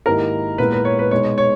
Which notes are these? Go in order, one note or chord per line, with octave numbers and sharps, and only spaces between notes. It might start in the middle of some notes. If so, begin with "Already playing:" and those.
G#2 D#3 A#3 E4 G4 A#4
A#2 G#3 B3 E4 B4
B4
C#5
B4
B2 G#3 D#4 C#5
C#5